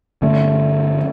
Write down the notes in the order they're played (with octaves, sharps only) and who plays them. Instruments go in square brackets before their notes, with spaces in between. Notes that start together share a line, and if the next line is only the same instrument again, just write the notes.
[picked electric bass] G2 D3 F3 C#4 [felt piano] A3